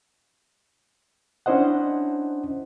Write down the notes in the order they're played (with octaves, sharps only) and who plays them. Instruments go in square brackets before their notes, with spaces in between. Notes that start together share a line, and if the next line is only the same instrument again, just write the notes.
[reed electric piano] C#4 D4 E4 C5 D#5 F#5